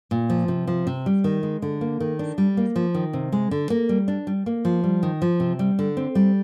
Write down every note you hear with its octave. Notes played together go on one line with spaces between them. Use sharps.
A#2
F3
C3
F3
C3
G3
D#3
G#3
D3
A#3
D#3
D4
G3
A#3
F3
D#3
C3
G#3
D3
A#3
G3
D4
G3
A#3
F3
G3
D#3
F3
C3
G3
D3
C4
G3